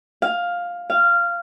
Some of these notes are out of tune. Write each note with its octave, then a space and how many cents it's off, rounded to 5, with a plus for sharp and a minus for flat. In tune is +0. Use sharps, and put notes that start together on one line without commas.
F5 +10
F5 -15